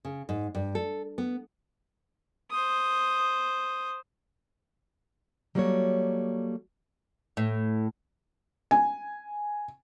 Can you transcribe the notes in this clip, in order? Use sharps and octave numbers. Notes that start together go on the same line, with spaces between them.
C#3
G#2
G2
A4
B3
C5 D#6
F#3 G3 A#3 F#4 A4 C#5
A2
G#5